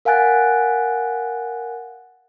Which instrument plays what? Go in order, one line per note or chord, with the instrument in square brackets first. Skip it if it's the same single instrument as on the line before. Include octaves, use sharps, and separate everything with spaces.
[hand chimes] A#4 F5 F#5 G#5 F#6 A6